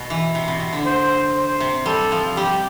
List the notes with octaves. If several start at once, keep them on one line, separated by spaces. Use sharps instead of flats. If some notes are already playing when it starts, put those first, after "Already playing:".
Already playing: B2
E3
C3
B2
C3
D3
C5
C5
C3
G3 A4
F3
G3 G4